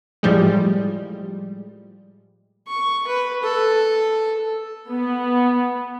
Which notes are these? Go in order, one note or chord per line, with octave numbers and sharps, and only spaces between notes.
A2 F3 G3 G#3
C#6
B4
A4
B3